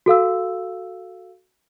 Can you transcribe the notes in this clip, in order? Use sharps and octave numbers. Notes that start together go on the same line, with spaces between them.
F#4 A4 F5 E6